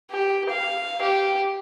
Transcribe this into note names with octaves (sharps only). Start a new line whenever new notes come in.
G4
F5
G4